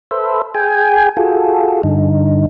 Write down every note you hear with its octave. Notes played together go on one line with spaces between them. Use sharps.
A4 B4 C5 E5
G#4 G5 G#5
F4 F#4 G#4 A4
G2 D3 D#4